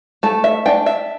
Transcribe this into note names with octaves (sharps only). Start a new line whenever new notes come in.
A3 A4
E5
D4 G5
E5